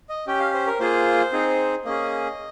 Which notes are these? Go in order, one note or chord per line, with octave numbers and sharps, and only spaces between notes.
D#5
C#4 G4 G5
F5
C5
A#4
A#3 F4 G#4 C5
C4 D#4 G#4
A#3 C#4 G#4 D#5